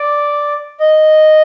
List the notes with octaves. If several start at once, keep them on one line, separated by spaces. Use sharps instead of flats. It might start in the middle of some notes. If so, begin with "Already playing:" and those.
Already playing: D5
D#5